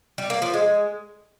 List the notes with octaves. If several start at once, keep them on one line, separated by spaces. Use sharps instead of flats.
G3
A#3
F3
G#3